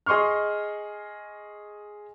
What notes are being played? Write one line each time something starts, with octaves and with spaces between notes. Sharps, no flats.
G#4 D#5 C6 C#6 F6